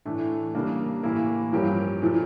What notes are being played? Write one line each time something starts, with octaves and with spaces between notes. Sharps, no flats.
A2 E3 A3 D4
C#3 G3 A#3 D4
A2 E3 A#3 E4
G2 F3 C#4 G4 A#4
A#2 F3 A3